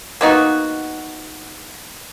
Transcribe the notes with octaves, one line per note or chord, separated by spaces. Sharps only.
A#3 B3 D#4 F#4